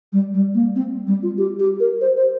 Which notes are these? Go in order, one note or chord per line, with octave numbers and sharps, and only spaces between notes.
G3
G3
A#3
C4
G3
F4
G4
G4
A#4
C5
C5